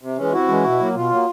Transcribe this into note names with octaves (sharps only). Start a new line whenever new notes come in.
C3
E3 G#3 C#4
C3 E4 F#4
E3 G#3 C#4
B2
F#3 A#3
B2 F4
F#3 A#3